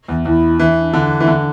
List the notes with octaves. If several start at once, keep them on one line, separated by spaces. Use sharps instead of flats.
E2
E2 E4
E3 D4
D3
E3
D3